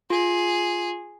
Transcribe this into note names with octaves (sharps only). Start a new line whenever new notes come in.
F4 G#4